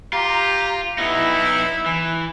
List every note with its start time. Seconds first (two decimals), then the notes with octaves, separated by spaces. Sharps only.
0.13 F4 G4 A#5
0.98 B3 D#4 E4
1.86 E3